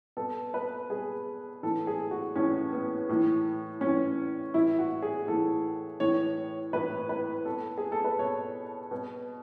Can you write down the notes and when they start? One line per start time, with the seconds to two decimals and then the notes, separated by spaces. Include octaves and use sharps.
0.17 B2 A4
0.54 B4
0.90 B2 G#4
1.63 A2 E3 A4
1.87 G#4
2.11 F#4
2.36 A2 E3 C#4
2.72 B3
3.09 A2 E3
3.81 A2 C#4
3.86 E3
4.54 A2 E3 E4
4.79 F#4
5.02 G#4
5.27 A2 E3 A4
6.00 A2 E3 C#5
6.73 A2 E3 B4
7.09 B4
7.45 B2 A4
7.78 G#4
7.92 A4
8.04 B4
8.19 B2 C#5
8.91 B2